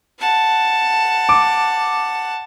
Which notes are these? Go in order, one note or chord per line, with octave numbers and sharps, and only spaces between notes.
F#5 A5
D6